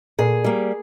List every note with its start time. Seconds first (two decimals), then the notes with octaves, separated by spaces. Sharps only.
0.18 A#2 G#4
0.44 G3 A#3